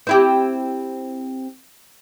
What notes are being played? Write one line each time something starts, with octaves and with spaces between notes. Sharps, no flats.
C4 E4 G4